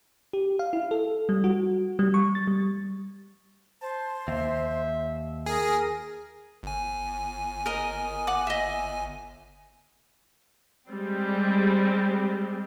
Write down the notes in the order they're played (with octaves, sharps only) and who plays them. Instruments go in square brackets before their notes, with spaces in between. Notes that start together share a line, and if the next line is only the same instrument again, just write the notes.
[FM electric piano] G4
F5
E4
A4
G3
F#4
G3
C#6
A6
G3
[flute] C5 [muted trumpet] A5
[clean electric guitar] D#2 [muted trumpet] E5
[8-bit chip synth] G#4 [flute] A#4
[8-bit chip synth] G1 G#5
[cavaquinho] A#4 D#5
F#5 D6
D#5 E5
[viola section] G3 G#3 C4